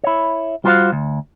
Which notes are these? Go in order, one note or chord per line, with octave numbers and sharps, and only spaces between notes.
E4 C#5
G3 F4 F#4 A4 C5 F5
D2